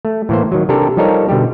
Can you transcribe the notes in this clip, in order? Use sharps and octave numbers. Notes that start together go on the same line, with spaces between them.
A3
A2 E3 A#3 C5
D#3 F#3
C3 D4 G4 A4 A#4
F3 G3 D#4 A4 A#4 C#5
B2 D3 G3 G4